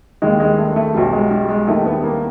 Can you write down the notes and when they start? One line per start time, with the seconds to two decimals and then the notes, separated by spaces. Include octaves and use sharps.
0.22 D#2 D#3 G3 G#3
0.40 G#3
0.58 A3
0.76 A3
0.94 B1 B2 G3
1.13 G#3
1.31 G3
1.49 G#3
1.67 D#2 D#3 G3 A3
1.86 B3
2.04 A#3